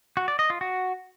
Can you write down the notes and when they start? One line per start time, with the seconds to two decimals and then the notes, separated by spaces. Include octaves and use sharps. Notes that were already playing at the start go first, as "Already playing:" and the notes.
0.17 F#4
0.28 D5
0.39 D#5
0.50 F4
0.61 F#4